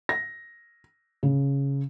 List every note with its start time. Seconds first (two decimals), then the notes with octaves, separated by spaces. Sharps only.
0.09 A#6
1.23 C#3